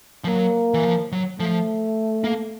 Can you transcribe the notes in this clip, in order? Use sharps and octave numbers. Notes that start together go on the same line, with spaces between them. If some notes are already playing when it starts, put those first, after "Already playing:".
F3
F#3 A#3
E3
F3
F#3
F3 A3
A#3